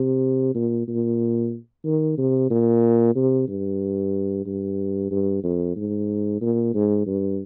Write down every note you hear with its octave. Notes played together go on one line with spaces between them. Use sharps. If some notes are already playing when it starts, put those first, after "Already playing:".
Already playing: C3
A#2
A#2
D#3
C3
A#2
C3
G2
G2
G2
F2
G#2
A#2
G#2
G2